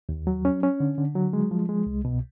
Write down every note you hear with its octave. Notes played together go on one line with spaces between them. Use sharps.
D#2
F#3
C#4
C#4
D3
D3
F#3
G#3
F3
G#3
C2
B2